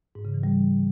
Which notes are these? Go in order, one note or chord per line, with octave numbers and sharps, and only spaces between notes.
G#2
C#3
E3
G3